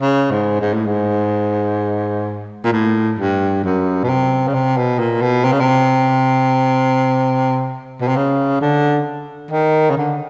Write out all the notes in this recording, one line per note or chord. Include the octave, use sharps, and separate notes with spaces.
C#3
G#2
G#2
A2
G#2
A#2
A2
G2
F#2
B2
C3
C#3
C3
B2
A#2
B2
C3
C#3
C3
B2
C3
C#3
D3
D#3
C#3
D3